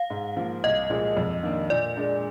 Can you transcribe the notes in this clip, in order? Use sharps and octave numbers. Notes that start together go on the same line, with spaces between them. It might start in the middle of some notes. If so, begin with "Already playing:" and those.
Already playing: F5
G#2
F3 A#3
C2 D#5
A#2 F3 G#3
F2
D#3 A#3 D4
A#2 D5
G#3 D4